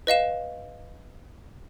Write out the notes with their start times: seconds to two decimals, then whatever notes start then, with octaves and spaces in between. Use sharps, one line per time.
0.07 B4 D#5 F5 E7